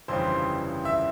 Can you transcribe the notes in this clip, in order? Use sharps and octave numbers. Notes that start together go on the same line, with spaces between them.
G1 F2 C#3 E3 G3 C5 C6
E5 E6